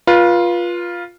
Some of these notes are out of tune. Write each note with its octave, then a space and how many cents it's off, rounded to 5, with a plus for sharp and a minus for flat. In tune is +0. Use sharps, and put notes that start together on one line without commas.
F4 +0 B4 -30